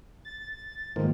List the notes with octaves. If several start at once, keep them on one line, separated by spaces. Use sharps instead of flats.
A6
G#2 D#3 F3 A#3